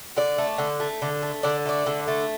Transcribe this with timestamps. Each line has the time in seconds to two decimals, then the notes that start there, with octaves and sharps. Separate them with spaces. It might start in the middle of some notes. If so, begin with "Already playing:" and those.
0.17 D3 D5
0.38 A3
0.58 D3
0.80 A3
1.02 D3
1.23 A3
1.43 D3 D5
1.66 A3 D5
1.87 D3
2.08 A3